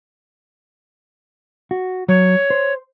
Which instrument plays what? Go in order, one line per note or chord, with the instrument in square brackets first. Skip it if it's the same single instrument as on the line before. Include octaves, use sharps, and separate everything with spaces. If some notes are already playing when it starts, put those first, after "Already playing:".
[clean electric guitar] F#4
[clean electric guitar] F#3 [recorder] C#5
[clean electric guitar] C5